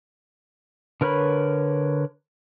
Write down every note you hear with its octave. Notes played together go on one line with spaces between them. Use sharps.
D3 A#4 B4 C#5 B5